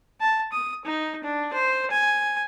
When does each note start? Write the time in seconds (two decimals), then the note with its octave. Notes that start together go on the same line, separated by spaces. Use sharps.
0.21 A5
0.52 D#6
0.85 D#4
1.24 D4
1.53 C5
1.91 G#5